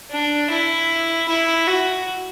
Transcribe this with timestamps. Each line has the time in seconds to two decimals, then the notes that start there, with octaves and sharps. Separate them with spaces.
0.11 D4
0.51 E4
1.28 E4
1.68 F#4